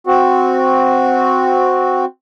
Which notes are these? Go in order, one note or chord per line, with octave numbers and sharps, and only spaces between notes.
C4 F#4